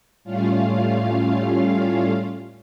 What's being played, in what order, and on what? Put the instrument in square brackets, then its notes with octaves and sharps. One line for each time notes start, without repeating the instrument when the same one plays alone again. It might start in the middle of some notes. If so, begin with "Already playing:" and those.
[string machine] A2 G3 A3 C#4 F4 F5